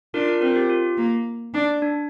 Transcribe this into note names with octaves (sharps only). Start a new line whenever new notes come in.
D4 F4 A#4
F4 A#4
C4 F4 A#4
G4
F4
A#3
D4
D4